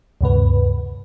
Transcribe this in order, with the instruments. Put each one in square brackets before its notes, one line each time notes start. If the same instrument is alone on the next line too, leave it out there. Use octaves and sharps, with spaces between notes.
[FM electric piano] D2 G2 C3 B4